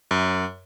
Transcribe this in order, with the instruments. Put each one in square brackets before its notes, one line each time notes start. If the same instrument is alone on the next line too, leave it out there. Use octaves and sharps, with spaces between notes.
[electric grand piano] F#2